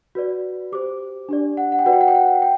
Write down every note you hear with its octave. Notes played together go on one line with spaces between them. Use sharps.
F#4 B4 D5
G4 C5 D6
D4 G4 D5
F#5
F#5
G5
F#4 B4 D5 F#5
G5
F#5
G5
F#5
G5